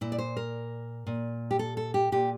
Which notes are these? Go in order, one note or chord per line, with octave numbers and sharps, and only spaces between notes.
A#2 E4
D5
C5
A#4
A#2
G4
A4
A4
G4
A#2 G4